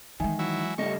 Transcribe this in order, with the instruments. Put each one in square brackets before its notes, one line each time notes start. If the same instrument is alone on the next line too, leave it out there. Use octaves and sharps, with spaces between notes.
[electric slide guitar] D#3 [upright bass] E3 G#3 [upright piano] E5 G#5
[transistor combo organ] F#3 E4
[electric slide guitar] G2 C#3 D#5 [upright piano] G3 A3 [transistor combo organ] C#6